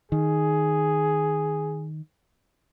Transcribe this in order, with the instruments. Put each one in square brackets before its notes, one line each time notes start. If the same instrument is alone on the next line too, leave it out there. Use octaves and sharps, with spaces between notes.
[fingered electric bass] D#3 [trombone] G#4